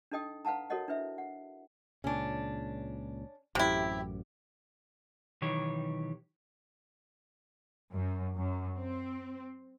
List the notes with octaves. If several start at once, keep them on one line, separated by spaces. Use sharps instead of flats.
D4 D#4 A4 D#5 G5 D#6
B4 F5 F#5 A5 A#5
F#4 A4 A#4 C#5 D#5 F#5
D4 E4 B4 E5
F#5
C#2 A#2 C#3 C#4 D4
A1 F#2 C3 E4 G4
B1 D#3 E3 G4 C#5
F#2
F#2
C4